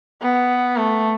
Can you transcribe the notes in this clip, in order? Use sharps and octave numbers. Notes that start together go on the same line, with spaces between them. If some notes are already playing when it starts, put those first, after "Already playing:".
B3
A3